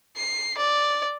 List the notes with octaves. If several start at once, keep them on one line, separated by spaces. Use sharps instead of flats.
C7
D5